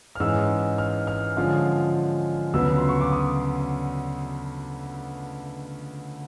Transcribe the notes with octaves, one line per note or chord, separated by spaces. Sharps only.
F6
G#2 E3 G#3 C#4 E6
F6
F6
D3 F3 G#3 C#4 F4
D2 C#3 F#3 B3 E6
C6
C#6
D6
D#6